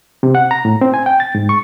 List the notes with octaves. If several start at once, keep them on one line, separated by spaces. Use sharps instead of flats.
C3
F#5
A#5
A2
C4
G#5
G5
A6
G#2
C#6